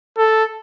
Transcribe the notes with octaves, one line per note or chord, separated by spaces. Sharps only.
A4